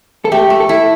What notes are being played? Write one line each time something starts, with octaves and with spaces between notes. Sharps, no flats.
A4
A3 G4
A3
A4
E4